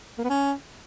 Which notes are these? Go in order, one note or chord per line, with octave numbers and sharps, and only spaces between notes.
A#3
B3
C#4